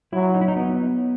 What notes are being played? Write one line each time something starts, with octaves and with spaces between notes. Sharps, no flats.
F#3 E4
D#4
E4
D#4
B3